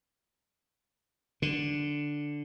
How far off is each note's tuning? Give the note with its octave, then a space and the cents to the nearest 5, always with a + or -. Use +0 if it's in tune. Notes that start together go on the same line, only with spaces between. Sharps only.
D3 +0